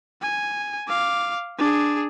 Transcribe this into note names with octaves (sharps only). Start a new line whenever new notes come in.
G#5
F5 D6
D4 G#4